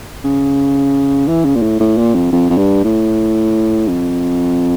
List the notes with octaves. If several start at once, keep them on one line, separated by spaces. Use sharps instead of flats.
C#3
E3
C#3
A#2
A2
A2
A#2
F2
F2
F2
G2
A2
F2